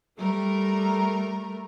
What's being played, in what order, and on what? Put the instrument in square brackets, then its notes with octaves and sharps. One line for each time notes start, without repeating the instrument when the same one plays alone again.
[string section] G3 A3 A#4